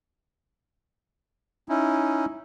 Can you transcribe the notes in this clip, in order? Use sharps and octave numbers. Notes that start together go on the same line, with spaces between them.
C#4 D#4 E4